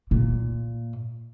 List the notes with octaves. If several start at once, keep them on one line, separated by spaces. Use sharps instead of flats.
A#2